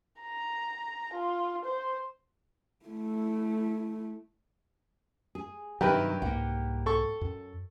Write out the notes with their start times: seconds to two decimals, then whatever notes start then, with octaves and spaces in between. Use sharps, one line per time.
0.21 A#5
1.13 F4
1.65 C5
2.86 A3 E4
5.35 G#4
5.81 G2 C3 D#3 F#3 G4 A#4 B4
6.22 C2 G#2 A#3 F#5 G5
6.86 A4 C#6
7.21 F#2